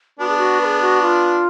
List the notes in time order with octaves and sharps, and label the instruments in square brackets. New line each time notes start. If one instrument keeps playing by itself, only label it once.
[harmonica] B3 D4 [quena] F#4
[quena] G#4
F#4
B4
G#4
F#4
F4